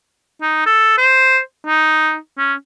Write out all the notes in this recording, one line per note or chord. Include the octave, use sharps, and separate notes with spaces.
D#4
A4
C5
D#4
C#4